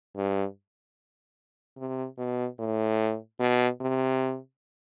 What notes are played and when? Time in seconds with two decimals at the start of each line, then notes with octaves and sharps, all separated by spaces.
0.16 G2
1.78 C3
2.18 B2
2.59 A2
3.40 B2
3.81 C3